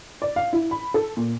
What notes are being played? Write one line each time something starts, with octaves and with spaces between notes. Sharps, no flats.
D5
F5
E4
B5
A4
A#2